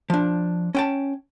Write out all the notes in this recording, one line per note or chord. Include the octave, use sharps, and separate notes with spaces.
F3 D4
C#4 G5 A5